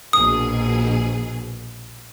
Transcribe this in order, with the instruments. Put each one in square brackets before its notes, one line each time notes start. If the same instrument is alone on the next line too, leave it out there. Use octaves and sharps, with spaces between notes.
[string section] A#1 B2 G#4 [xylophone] D#6